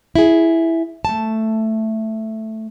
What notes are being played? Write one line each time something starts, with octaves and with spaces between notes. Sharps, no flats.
E4 G#4
A3 A5